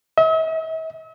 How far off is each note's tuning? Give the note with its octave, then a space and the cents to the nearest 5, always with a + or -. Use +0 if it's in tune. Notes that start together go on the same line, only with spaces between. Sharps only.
E5 -45